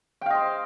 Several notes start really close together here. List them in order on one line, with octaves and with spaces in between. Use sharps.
G5 F5 D#5 C5